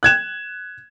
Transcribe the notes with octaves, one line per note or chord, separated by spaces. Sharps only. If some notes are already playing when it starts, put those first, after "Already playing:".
F#6 G#6 E7